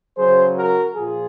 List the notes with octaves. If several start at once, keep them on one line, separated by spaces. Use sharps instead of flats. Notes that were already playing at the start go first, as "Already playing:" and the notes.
C#3 F#3 G#4 C5
F#4 A#4
A#2 F3 F4 G#4